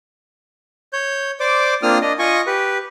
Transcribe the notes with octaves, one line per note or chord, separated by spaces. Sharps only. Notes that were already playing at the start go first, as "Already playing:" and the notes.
C#5 G6
C5 D5 D6
A#3 C4 D4 F4 D#6 F6
D4 D#5
F4 D#5 G#5 C#6
G4 B4